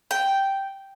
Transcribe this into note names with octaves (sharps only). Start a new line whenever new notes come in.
G5